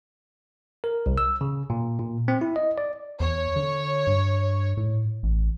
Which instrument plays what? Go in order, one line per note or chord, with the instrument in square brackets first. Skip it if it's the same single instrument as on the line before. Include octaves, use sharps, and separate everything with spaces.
[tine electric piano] A#4
C2
E6
C#3
A#2
A#2
C4
E4
D#5
D5
[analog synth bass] E2 [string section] C#5
[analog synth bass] D3
G2
A2
A1